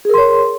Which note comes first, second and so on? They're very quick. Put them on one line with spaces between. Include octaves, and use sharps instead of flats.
G#4 A#4 C6 C#5